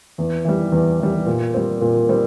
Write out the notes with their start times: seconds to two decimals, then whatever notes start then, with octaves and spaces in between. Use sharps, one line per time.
0.18 E2
0.45 E3 G3
0.72 E2
1.00 E3 G3
1.26 A#2
1.54 G3 C4
1.81 A#2
2.09 G3 C4